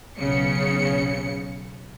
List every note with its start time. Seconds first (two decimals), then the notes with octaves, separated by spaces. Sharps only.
0.17 B1 C#3 B3 C#7